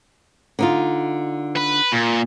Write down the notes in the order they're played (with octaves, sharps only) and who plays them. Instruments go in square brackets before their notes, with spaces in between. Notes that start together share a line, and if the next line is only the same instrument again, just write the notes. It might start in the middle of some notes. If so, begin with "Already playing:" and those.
[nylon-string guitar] D3 D#4 F4
[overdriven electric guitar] B4
A#2